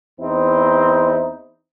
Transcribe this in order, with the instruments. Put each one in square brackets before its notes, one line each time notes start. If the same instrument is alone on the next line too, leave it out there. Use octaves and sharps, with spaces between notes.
[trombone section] E2 C4 D#4 E4